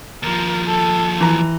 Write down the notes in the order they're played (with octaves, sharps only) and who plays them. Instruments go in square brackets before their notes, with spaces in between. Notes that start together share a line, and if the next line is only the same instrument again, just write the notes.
[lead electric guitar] D#2 F3 [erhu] A#4
[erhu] A4
[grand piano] E3 A#5